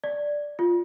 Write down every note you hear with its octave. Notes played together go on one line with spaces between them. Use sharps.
D5
F4